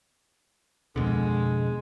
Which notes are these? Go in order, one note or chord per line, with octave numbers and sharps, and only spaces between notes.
F2 B2 D3 G#3